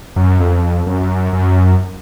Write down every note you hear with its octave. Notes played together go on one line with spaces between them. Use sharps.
F#2
F2
F#2
F#2